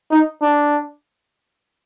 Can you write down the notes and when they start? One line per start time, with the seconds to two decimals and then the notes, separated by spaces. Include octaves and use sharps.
0.11 D#4
0.42 D4